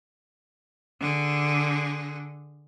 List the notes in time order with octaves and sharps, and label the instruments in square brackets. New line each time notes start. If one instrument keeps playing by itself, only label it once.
[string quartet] D3 G#4